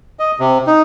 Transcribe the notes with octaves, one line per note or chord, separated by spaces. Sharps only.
D#5
C3
D#4